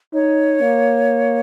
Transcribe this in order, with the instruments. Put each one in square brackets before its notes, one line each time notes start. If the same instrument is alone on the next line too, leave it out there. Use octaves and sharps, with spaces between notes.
[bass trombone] D#4 [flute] C#5
[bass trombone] A#3